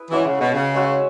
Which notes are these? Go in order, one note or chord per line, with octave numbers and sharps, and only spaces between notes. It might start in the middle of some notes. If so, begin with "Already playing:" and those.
Already playing: E4 G#4 B4
E3 G#3 C#4 F#4 E5
C#3
B2
C#3
G#3 C#4 F#4 E5